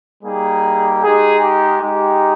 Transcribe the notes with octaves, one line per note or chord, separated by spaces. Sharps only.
G3 A#3 D#4 G4 G#4
G#3 D#4 G4 G#4
G4
G#3 D#4 G4